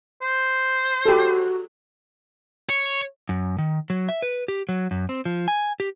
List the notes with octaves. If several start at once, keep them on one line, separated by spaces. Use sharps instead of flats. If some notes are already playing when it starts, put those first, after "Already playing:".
C5
F#4 G4 A4
C#5
F#2
D#3
F#3
E5
B4
G4
F#3
F#2
C4
F3
G#5
G4